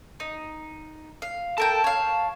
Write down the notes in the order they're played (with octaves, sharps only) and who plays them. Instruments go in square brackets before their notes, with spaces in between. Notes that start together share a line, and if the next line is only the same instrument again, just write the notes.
[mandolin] D#4
F5
[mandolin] A4 A#4 G5 [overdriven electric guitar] A5
[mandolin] C#5 F5